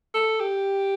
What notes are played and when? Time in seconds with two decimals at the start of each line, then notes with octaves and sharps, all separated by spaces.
0.14 A4
0.40 G4